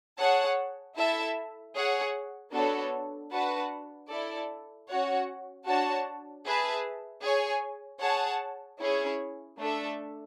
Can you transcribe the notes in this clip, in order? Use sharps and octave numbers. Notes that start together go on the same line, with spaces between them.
G#4 C#5 F#5 A5
E4 A4 E5 A5
G#4 C#5 F#5
B3 D4 F#4 A4 C#5
D4 F#4 B4 F#5 A5
E4 A4 D5
C#4 F#4 C#5 F#5
D4 F#4 C#5 F#5 A5
G#4 B4 E5 A5
G#4 C#5 G#5
G#4 C#5 F#5 A5
C#4 E4 G#4 C#5
A3 D4 A4 E5